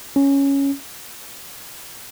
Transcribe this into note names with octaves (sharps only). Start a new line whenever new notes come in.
C#4